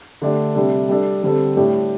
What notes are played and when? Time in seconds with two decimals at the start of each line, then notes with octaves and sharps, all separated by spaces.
0.22 D3 A3 D4 G4
0.55 C3 G3 D4 A4
0.89 G3 D4 A4
1.23 D3 G3 C4 A4
1.56 A2 G3 D4 G4